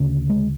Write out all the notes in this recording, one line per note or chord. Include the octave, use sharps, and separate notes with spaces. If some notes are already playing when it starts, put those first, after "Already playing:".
Already playing: D2 C#3
G#3